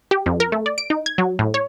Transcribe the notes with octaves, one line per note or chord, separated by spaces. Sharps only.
G4
F2
A#4
A3
D5
D7
D#4
G#6
F#3
A2
C#5